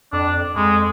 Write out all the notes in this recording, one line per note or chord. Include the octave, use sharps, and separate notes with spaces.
F2 D4
F2 G#3